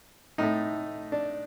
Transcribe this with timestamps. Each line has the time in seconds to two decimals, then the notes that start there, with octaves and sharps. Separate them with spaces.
0.38 A2 A3 D#4
1.12 D4